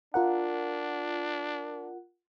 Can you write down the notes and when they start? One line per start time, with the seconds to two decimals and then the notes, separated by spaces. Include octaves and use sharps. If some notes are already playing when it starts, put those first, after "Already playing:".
0.14 D4 F4 A#4 F#5